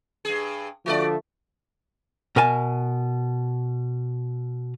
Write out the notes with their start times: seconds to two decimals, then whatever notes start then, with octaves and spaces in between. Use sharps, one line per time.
0.25 G2 G#4
0.86 D3 F3 A3 F#4 A4 D5
2.36 B2 A#4 G#5 A5